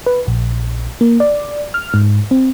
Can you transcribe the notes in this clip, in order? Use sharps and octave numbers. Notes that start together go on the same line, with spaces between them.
B4
A#1
A#3
D5
F6
G#2
C4